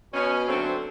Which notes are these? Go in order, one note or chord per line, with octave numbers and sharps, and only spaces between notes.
B2 C#4
D3 F#3 A3 C4